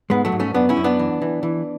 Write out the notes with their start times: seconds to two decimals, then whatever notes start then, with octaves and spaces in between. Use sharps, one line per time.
0.10 G#2 G#3 B3
0.25 F#3 A3
0.32 G#2
0.40 A3 C#4
0.54 F#2 B3 D4
0.69 C#4 E4
0.77 F#2
0.84 B3 D4
0.99 E3
1.22 E3
1.43 E3